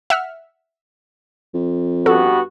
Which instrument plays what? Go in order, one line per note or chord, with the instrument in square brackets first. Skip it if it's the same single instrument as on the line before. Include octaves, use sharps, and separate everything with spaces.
[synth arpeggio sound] E5 F#5 F6
[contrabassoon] F2
[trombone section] G2 B3 F#4 [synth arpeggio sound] A4